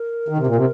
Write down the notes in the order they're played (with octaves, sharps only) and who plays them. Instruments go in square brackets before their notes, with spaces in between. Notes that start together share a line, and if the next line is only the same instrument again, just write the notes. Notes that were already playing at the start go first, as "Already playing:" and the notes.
Already playing: [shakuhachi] A#4
[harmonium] D#3
C3
A#2
C3